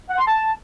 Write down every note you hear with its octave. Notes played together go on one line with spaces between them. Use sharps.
F#5
C6
A5